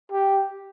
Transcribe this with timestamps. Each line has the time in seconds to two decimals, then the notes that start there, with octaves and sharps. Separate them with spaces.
0.12 G4